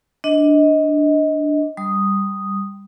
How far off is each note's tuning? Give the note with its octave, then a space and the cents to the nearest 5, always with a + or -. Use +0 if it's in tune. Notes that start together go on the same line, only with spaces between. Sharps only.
D4 +0 D#5 +20
G3 +0 D#6 +0